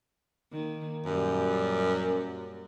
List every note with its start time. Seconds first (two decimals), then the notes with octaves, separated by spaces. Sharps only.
0.52 D#3 A#3
1.06 F#2 A#2 G3